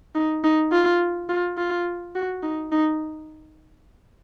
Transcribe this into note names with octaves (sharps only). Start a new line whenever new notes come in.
D#4
D#4
F4
F4
F4
F#4
D#4
D#4